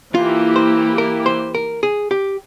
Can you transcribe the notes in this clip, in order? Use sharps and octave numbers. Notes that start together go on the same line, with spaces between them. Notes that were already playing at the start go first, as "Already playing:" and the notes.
E3 A#3 E4 F4 G4
C5
A#4
C5
A#4
G#4
G4